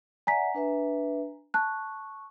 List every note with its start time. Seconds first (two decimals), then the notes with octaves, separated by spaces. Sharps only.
0.27 D5 E5 F#5 G#5 A#5 B6
0.54 D4 B4 E5
1.54 A5 C#6 F#6